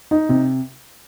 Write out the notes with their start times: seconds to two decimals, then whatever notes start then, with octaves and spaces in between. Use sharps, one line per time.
0.11 D#4
0.29 C3